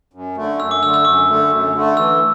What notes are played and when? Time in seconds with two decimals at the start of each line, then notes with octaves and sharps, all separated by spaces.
0.13 F#2
0.37 D3 A3
0.60 F#2 E6
0.71 D6
0.82 D3 E6
0.86 A3
0.94 E6
1.05 F#2 D6
1.28 D3 A3
1.51 F#2
1.74 D3 A3
1.97 E3 E6